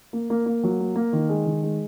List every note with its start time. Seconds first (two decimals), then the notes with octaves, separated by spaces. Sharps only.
0.13 A#3
0.30 A#3
0.46 A#3
0.63 F#3
0.80 A#3
0.96 A#3
1.13 D#3
1.29 G#3
1.46 D#3
1.63 G#3